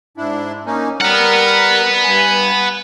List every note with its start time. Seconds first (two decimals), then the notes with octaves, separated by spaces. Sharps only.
0.17 G#2 D4 E4
0.66 A#3 C#4 D#4
1.01 G3 A#4 B4 F#5 F6
2.04 G2 G#5